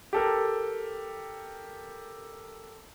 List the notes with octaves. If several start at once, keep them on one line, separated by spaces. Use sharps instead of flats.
G4 A4 A#4